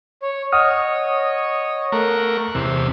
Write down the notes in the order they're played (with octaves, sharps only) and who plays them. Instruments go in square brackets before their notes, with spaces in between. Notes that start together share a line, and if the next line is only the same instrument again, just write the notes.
[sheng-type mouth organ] C#5
[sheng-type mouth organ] C#5 D#5 [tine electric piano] F#5 D#6 F6
[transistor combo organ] A3 A#4 [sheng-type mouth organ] F#6
[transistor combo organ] E2 C3